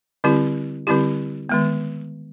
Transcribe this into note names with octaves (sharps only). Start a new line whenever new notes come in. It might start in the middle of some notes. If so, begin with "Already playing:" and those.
D3 G3 C4 E4 G4
D3 G3 C4 E4 G4
D#3 G#3 B3